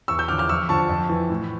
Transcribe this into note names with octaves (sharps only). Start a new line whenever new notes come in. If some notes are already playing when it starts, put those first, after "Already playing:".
E2 C#6 E6
E6 G6
D3 F3 D6 F6
D6 F6
F2 C#6 E6
D3 F3 A5 C#6
F2
E3
A2